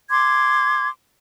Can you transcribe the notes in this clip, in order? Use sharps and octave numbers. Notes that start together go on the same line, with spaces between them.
C6 D6 G#6